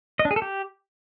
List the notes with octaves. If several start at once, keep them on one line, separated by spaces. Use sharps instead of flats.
D#5
D4
G#4
A4
G4